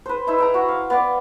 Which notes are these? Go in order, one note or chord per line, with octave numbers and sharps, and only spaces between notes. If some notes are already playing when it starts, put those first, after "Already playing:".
B4 C5
D#4 E4 E5
E5 G5 A#5
F#4
F5
B3 D5